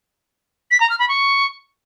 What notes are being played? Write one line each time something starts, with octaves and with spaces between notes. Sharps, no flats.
B6
A#5
F6
B5
C#6